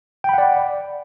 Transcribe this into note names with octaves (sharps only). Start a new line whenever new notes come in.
D5 F#5 G5 B5